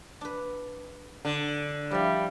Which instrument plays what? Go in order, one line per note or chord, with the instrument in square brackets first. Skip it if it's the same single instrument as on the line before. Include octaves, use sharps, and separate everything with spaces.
[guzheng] D4 B4
[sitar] D3
[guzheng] F3 E4 [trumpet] G3